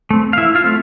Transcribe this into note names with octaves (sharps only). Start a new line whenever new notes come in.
A3 C4
F5
E3 E4 E5
F4 F5
A3 C4